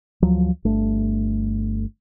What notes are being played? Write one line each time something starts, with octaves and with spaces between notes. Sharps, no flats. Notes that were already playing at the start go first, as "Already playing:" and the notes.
D2 F3 F#3
G1 A3 D4